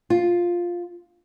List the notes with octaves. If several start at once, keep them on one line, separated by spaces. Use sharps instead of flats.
F4